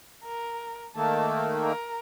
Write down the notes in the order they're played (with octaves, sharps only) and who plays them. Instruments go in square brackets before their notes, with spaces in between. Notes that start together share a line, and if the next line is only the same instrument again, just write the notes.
[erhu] A#4
[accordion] D#3 A3 A#3 [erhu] A5
[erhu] A#4